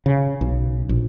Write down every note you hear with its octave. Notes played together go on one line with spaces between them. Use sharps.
C#3
B1
A#1